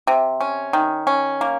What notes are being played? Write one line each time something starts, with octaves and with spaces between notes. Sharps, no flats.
C3
C#4
D#3
C#4
A#3